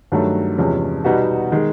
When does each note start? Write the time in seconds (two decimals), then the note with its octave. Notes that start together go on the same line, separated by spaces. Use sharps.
0.12 G2 D#3 F#3 A3
0.58 E2 C3 F3 G#3 C#4
1.04 B2 G3 B3 D#4 F#4
1.52 D#3 G#3